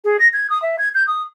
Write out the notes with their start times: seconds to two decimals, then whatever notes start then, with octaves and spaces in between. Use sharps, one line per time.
0.04 G#4
0.19 A#6
0.33 G#6
0.50 D#6
0.62 E5
0.79 G#6
0.94 G6
1.07 D#6